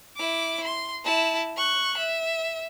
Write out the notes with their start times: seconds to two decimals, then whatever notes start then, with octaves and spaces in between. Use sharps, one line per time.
0.17 E4 D6
0.64 C6
1.05 E4 A5
1.57 C#6 F#6
1.97 E5